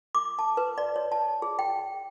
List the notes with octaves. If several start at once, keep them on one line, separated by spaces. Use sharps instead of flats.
D6
A5
B4
D5
C#5
A5
G#4
G5